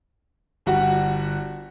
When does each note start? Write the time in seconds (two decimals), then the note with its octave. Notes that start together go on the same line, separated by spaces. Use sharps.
0.66 G1 G3 F#4 F#5